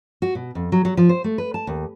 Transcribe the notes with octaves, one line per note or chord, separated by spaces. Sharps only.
F#4
B2
F2
F#3
F#3
F3
C5
A3
B4
A5
D#2